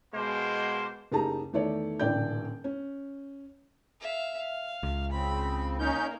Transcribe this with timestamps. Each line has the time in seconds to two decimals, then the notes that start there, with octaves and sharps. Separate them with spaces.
0.14 B2 G#3 A#3 C5
1.12 F#1 D#4 G4 G#4 A5 A#5
1.53 E2 D#3 A3 C#5 D5
1.99 D#1 A1 D3 D5 G5 G6
2.64 C#4
4.01 E5 F5
4.37 F5
4.83 C#2
5.12 C#3 C4 B5
5.79 A#3 C#4 D#4 G6